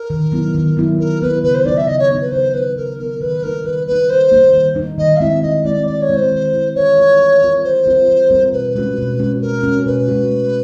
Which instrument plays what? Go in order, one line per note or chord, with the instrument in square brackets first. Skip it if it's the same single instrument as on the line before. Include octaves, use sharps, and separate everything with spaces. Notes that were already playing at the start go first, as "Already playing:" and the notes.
Already playing: [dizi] A#4
[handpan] D#3
F#3 B3 E4
D#3
F#3 B3 E4
[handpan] D#3 [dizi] A#4
[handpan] F#3 B3 E4 [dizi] B4
[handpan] C#3 [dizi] B4
[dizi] C5
[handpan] F#3 B3 D#4 [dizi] D5
[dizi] E5
[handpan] C#3 [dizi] D#5
[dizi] C#5
[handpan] F#3 B3 D#4
[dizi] B4
[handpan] C#3 [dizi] C5
[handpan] F#3 B3 D#4 [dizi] B4
[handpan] C#3 [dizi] A#4
[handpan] F#3 B3 D#4 [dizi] A#4
[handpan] D#3 [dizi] B4
[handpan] G3 A#3 D#4 [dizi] A#4
[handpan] D#3 [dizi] B4
[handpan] G3 A#3 D#4 [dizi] B4
[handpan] D#3 [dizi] C5
[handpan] G3 A#3 D#4
D#3
G3 A#3 D#4
[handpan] D#3 [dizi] D#5
[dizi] F5
[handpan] G#3 C4 E4 [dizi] E5
[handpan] D#3 [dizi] D#5
[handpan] G#3 C4 E4 [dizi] D5
[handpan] D#3 [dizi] D5
[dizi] C#5
[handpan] G#3 C4 E4
[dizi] C5
[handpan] D#3
G#3 C4 E4
[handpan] E3 [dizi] C#5
[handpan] G3 C4 F4 A#4
E3
G3 C4 F4 A#4
[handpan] E3 [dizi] C5
[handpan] G3 C4 F4 A#4
E3
G3 C4 F4 A#4
[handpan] B2 [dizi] B4
[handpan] G#3 C#4 F#4
B2
G#3 C#4 F#4
[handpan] B2 [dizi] A#4
[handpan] G#3 C#4 F#4
[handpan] B2 [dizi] B4
[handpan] G#3 C#4 F#4
A3